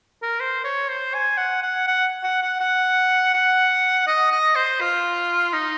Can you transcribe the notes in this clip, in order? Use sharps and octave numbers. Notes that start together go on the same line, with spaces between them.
A#4
C5
C#5
C5
G#5
F#5
F#5
F#5
F#5
F#5
F#5
F#5
D#5
D#5
C5
F4
D#4